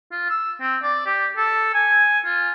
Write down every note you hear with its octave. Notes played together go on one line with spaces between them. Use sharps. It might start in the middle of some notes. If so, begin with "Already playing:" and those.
F4
E6
C4
D5
G4
A4
G#5
F4